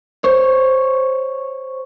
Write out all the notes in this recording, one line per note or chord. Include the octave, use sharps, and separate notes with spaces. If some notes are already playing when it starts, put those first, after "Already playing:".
C5 C#5